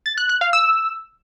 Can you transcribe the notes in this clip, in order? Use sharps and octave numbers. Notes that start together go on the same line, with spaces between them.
A6
F#6
F#6
F5
E6